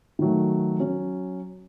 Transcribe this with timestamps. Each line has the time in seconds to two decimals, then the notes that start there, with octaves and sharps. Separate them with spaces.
0.19 D#3 F#3 A3
0.80 F#3 C#4